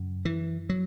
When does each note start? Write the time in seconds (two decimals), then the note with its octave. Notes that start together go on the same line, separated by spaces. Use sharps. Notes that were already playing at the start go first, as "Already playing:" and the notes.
Already playing: F#2 C#3
0.25 E3
0.69 F#3